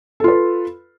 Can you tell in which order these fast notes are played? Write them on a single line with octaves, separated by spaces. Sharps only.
A4 F4 B4